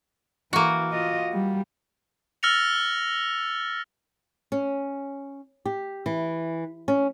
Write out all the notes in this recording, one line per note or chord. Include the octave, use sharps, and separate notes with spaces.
E3 A#3 F#4
F4 D#5
G3
E6 F6 A6 A#6 C#7 F7
C#4
G4
E3
C#4